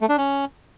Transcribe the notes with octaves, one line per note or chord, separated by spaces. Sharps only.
A3
D4
C#4